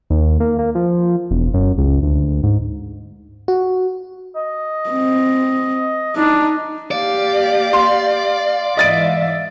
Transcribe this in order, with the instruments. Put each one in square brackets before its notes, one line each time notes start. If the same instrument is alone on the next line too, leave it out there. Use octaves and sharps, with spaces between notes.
[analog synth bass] D#2
A#3
A#3
F3
E1
F#2
C#2
D2
G#2
[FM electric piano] F#4
[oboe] D#5
[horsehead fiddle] C4
[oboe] D4 [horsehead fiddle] D#4
[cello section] A#3 G4 [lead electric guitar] D5 [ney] F5
[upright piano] C6
[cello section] G#2 E3 E5 [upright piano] D#5 A6 D7